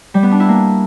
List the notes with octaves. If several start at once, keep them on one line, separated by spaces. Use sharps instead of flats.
G3
B3
D4
E4
A#3